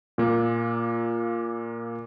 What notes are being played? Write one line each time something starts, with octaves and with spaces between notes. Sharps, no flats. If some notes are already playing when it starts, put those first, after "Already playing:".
A#2 A#3